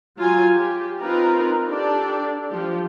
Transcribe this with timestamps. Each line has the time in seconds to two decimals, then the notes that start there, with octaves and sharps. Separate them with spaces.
0.17 F#3 F4 G#5
0.53 G4
1.00 C4 D#4 F4 A#4 B4
1.67 D4 G4 A4 D5
2.50 F3 G4